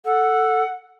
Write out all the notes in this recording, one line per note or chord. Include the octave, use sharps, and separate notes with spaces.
A4 F#5